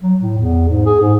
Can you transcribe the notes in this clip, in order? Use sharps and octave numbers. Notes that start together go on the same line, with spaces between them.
F#3
A2
E2
G#2
G#4
G#2